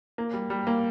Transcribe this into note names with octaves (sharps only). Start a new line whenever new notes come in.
A#3
G3
G3
A#3